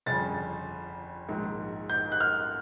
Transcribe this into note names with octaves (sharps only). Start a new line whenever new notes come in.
G1 F2 C#3 A6
A#1 G#2 D#3
G6
F#6
F6